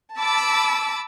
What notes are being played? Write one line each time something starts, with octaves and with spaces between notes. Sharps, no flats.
A5 B5 D6 E6